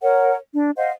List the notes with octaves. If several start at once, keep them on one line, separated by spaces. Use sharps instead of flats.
A#4 C#5 F#5
D4
C5 D#5 F5 F#5